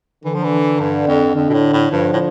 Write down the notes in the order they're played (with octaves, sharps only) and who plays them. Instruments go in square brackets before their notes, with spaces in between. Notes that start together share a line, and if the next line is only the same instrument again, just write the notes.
[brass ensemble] D3 [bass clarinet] E3
[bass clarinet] F3
E3
G2
F2
[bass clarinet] F2 [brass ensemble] D3
[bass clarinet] B2
A2
A2
[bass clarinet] G2 [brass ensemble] D3 F3
[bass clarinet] A2